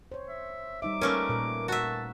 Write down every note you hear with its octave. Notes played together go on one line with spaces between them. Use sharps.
C5 C#5
E5
G3 D#4 E5 D6
A3 A#3 C#4 A#4 B4
A#2 A#4
F#4 E5 A5